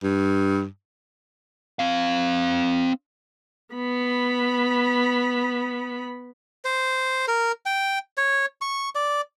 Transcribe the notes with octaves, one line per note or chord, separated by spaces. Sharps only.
G2
C4 F5
B3 B5
C5
A#4
G5
C#5
C#6
D5